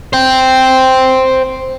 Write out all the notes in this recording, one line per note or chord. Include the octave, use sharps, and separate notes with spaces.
C5 G5